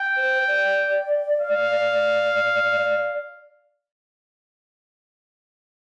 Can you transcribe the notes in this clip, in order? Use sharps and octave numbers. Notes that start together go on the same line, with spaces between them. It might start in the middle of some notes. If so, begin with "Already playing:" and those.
Already playing: G5
C5
D5
F5